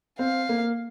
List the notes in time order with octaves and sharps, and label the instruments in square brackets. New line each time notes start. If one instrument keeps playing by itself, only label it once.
[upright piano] C4 [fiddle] F5
[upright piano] A#3